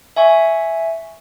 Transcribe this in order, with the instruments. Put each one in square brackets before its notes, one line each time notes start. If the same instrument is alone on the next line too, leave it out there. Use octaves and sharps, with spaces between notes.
[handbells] E5 G#5 C#6